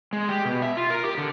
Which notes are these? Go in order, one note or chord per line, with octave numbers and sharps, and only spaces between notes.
G#3
G4
B2
E5
F4
A#4
G4
D3